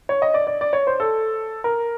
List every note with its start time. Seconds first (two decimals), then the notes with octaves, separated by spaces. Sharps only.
0.09 C#5
0.22 D#5
0.34 D5
0.47 D5
0.61 D5
0.73 C#5
0.87 C5
1.00 A4
1.64 A#4